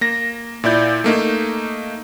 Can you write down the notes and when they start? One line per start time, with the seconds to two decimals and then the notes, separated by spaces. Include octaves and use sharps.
0.01 A#3 A#6
0.64 A#2 E4 D5 G6
1.04 A3 A#3 D#4